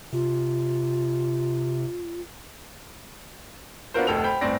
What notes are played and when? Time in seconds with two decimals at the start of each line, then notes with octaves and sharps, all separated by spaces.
0.12 C3 F4
3.94 B3 D4 F4 F#4 A#4 C5
4.07 F1 D2 B2 A4 G5 F7
4.24 C5 G5 B5
4.41 G1 A2 C4 D5 A#6